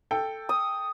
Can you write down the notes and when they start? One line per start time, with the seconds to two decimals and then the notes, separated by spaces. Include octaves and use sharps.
0.11 A4 G5
0.49 D#6